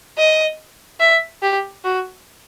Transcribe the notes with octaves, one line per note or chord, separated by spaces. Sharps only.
D#5
E5
G4
F#4